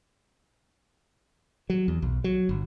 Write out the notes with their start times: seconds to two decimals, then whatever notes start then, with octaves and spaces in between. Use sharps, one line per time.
1.70 F#3
1.88 E2
2.02 B1
2.24 F#3
2.49 G1